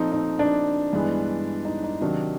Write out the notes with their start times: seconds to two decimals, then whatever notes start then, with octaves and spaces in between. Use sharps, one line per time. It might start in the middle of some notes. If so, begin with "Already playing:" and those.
Already playing: A#2 F3 A3 C4 D#4
0.12 D#4
0.39 D4
0.93 G2 E3 G#3 B3
1.65 D#4
1.83 D#4
2.01 C3 D#3 F#3 D4